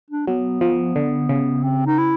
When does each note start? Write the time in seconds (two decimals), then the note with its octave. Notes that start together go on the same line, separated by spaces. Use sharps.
0.10 D4
0.27 F#3 B3
0.61 F3
0.96 D3
1.29 C#3
1.63 C4
1.86 D#4
1.98 E4